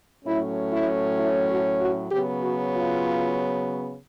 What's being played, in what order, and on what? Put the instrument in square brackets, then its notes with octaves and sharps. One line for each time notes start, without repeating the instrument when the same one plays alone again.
[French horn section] A2 F#3 A3 C#4 E4
E4
E4
F#4
F#4
C#3 F#3 B3 G4
F#4
F4